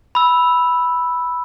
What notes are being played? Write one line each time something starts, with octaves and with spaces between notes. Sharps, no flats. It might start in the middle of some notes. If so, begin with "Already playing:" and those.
B5 E6